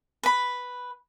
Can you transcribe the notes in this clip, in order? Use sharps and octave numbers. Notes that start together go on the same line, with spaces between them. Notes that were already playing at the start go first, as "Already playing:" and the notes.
B4 B5